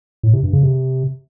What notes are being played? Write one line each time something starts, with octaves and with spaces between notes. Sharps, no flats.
A2
C3
G2
C#3
C3